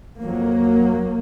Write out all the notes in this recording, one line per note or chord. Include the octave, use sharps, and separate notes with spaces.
F2 F#3 A#3